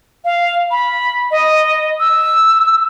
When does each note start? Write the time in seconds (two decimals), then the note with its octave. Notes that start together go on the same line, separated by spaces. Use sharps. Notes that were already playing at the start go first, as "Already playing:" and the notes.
0.25 F5
0.71 B5
1.31 D#5
2.00 E6